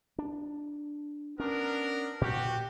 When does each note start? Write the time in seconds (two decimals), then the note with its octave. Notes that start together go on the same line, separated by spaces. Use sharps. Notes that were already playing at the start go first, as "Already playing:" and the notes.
0.19 D4
1.40 B3 C#4 D4 A#4
2.21 A#2 F#4 G4